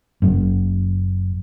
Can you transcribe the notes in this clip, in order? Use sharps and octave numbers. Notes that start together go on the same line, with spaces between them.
F#1 F#2